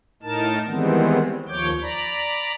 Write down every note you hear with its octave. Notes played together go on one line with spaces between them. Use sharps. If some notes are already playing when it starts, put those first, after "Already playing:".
A2 D#4 A#4 A5
D#3 E3 G3 G#3 B3 C4
D#2 F3 C#5 D6 G6
D5 A#5 B5